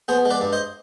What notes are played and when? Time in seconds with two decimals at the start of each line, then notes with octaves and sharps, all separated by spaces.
0.08 B3 G#4 C5
0.25 G#3
0.30 B4 D5
0.41 G2
0.53 C5 D#5